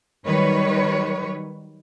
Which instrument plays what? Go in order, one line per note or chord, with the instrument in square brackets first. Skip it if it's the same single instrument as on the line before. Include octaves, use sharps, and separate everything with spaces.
[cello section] D#3 F#3 G3 B4 C#5